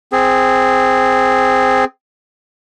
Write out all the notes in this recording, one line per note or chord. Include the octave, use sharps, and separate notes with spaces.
C4 G#4